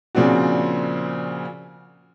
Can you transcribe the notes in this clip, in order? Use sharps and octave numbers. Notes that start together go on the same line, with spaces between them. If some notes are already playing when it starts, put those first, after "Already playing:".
A#2 C#3 F3 C4 D4 F#4